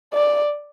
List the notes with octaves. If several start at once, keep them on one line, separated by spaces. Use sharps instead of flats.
D5